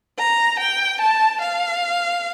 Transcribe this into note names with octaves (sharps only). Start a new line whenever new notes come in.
A#5
G5
A5
F5